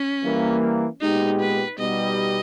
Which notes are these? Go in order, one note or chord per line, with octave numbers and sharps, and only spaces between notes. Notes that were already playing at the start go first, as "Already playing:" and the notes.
Already playing: C#4
E3 G3 A#3
A#2 G#3 B3 D#4 G4
B4
B2 G3 B3 D#4 G4 D#5